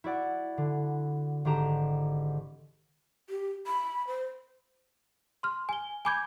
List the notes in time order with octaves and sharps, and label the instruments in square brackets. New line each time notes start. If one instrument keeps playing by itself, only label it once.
[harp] E4 F#4 D5 F#5
D3
G#1 D3 G4 A#5 E7
[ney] G4
B5
C5
[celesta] C6 F6
G#5 G7
G#5 B5 D6 G6 G#6